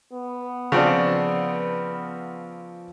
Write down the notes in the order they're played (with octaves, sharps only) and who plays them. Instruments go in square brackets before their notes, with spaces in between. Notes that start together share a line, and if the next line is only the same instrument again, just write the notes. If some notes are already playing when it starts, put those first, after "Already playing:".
[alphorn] B3
[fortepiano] C#3 C4 D4 [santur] F3